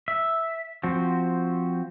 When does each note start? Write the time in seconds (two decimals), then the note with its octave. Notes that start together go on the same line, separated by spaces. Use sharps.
0.08 E5
0.83 F3 C4 F#4